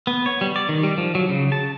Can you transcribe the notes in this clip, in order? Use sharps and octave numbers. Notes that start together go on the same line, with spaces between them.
B3
C#5
G3
D5
D#3
G3
F3
F#3
C#3
A5